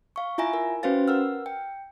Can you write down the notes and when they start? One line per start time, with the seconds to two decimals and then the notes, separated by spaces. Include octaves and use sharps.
0.16 F5 C#6
0.38 E4 F4 E5 G#5 A#5 A#6
0.53 A#4
0.83 C#4 F#4 B4 C5 F5 A6
1.08 A#4 F#5 E6 F6
1.46 G5